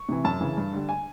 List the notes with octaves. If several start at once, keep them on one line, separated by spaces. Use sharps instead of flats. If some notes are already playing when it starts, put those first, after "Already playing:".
Already playing: C#6
C3 E3
F#2 A5
C#3 E3
G2
D3 G3
G#5